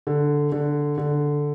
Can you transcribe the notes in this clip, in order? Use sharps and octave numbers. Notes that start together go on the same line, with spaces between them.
D3
D3
D3